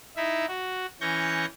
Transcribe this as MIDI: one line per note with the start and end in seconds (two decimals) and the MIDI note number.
0.16 0.46 63
0.16 0.46 64
0.16 0.46 76
0.48 0.86 66
1.01 1.46 52
1.01 1.46 61
1.01 1.46 85
1.01 1.46 91
1.01 1.46 94